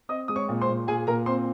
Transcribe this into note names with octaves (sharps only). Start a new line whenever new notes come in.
C4 D#5 D#6
G#3 D#6
C#5 C#6
A#2
C5 C6
A#2
A#2 G#4 G#5
A#2 A#4 A#5
C4 C5 C6